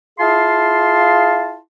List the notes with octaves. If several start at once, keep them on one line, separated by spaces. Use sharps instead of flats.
E4 F4 G#4 F5 A5 C6